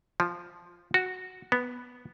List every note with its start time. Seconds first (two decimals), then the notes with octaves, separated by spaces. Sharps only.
0.20 F3
0.94 F#4
1.52 B3